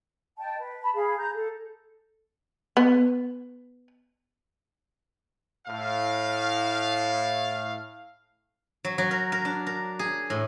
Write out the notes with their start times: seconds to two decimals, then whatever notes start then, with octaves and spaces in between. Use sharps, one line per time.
0.38 D#5 G5 A5
0.57 B4
0.82 A5 B5
0.95 G#4 F5 B5
1.18 A#5 G6
1.33 A4
2.77 B3
5.67 A2 F5
8.85 F#3
8.98 F#3
9.11 A#4
9.32 A#4
9.45 D4
9.67 A#4
9.99 G#4
10.30 A2